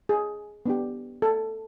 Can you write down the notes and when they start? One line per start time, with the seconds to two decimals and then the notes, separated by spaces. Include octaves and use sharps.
0.09 G#4
0.66 B3 D4 G4
1.22 A4